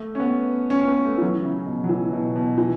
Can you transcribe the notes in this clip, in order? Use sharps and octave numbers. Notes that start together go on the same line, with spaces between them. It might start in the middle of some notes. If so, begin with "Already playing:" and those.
Already playing: A3
C#4
B3
C#4
C#4
B3
A3
E3
F#3
C#3
B2
F#3
E3
B2
B2
E3